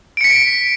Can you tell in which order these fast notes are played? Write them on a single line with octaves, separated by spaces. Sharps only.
D7 C#7 B6